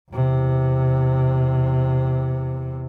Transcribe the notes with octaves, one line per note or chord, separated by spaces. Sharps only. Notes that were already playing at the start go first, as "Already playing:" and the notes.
E2 C3